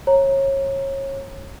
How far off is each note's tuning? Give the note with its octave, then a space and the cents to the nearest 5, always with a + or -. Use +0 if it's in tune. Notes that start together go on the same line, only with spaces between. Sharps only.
C#5 -25 A#5 +0